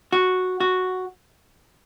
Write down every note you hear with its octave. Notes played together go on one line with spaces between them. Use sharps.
F#4
F#4